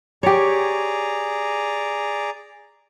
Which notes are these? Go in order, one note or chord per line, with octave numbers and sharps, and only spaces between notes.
G4 G#4 C#5 D5 A#5